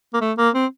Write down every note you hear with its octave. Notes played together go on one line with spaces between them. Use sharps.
A#3
A3
A#3
C4